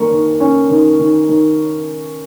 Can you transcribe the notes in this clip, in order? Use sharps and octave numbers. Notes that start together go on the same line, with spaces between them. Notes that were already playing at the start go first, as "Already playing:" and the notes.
Already playing: D#3 A#3 C#6
D#3
C#4
D#3
D#3
D#3